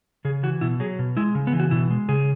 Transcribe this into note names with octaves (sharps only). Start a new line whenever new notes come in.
C#3 G#4
E3 F#4
B2 E4
F#3 G#4
B2
G#3 E4
C#3
B3
E3
F#4
B2 E4
G#3
C#3 G#4